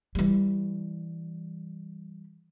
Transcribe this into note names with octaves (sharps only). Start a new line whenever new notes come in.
E3 G3